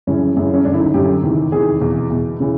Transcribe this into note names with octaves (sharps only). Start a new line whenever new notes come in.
F#2 C#3 E3 C#4
F#2 C#3 E3
C#4
F#2 D3 D4
E4
D#4
F#2 D3 G4
E2 C3 D#3
E2 C3 D#3 G#4
E2 B2
E2 B2
C#3 E3